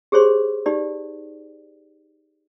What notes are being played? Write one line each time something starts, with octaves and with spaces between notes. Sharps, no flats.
G4 G#4 C5 C#5 C6
D#4 G4 D5